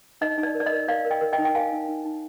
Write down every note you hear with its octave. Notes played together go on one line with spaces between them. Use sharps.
D#4 D#5
D#4
D5
A#4
D5
D#5
A#4
A#4 D5 F5
A#4
D#5 G5
A#4
D#5 G5
D#4
G5
A#4 F5 G#5
D#4
D#4
D#4